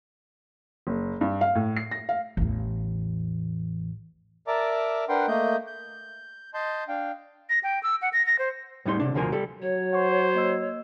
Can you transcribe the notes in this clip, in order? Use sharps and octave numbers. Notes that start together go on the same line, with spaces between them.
F#1
G2
F5
A2
C7
A#6
F5
A1 E2
A#4 D5 E5 A5 A#5 D6
D4 A#4 B4 F#5 G5 C6
A3 A#3 D#5 G6
G6
D#5 A5 C6 G6
D4 F5 G5
A#6
G5
E6
F#5
A#6
A#6
C5
A2 G3 D#4 C6
C3 D4
D2 B2 D3 F3 A#4 G#5
G3 A4
F#3 C#5
C5 F#5 C#6
A#3 D#5 E6